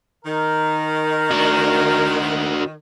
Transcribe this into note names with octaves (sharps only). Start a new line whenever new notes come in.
D#3 A#4
D4 F#4